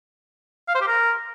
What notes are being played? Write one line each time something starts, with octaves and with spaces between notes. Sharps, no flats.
F5
C5
G4
A#4